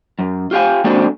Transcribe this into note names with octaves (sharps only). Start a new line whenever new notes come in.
F#2
F4 G4 F5 G#5
G#3 A#3 C4 D4 F#4 A4